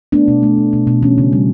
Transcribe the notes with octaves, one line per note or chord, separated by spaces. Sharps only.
A3 B3 D4
B2
A3
B2
B2
B2
E3 C#4
C#3
G3